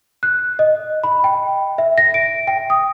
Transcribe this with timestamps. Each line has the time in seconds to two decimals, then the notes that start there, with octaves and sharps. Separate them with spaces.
0.23 F#6
0.59 D#5
1.04 B5
1.24 G5
1.78 E5
1.98 A#6
2.14 D7
2.47 G5
2.70 D#6